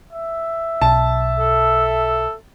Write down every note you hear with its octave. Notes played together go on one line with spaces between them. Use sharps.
E5
B1 A5
A4